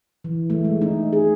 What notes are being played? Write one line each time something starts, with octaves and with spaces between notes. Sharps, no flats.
E3
A3
G#3
D#4
G#4